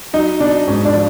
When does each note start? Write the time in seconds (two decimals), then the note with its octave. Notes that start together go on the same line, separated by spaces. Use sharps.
0.13 F#3 D#4
0.40 B2 D4
0.67 G#2 C#4
0.85 D4
0.94 F3